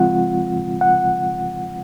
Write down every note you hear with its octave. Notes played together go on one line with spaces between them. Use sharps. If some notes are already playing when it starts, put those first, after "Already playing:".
Already playing: C#3 F3 G#3 C4 F4 F#5
F#5